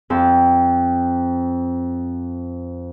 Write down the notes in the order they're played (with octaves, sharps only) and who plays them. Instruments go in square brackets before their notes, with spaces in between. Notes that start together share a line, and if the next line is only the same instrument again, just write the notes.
[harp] F2 C4